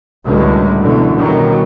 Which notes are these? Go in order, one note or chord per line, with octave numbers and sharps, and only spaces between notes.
C#2 F#2 A2 D3 G3 G#3
F#2 B2 D3 E3
F#2 B2 D#3 F#3 G3 B3